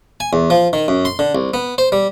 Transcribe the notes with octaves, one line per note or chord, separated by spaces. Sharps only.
G#5
E2
F3
D#3
F#2
C6
D3
C2
B3
C5
G3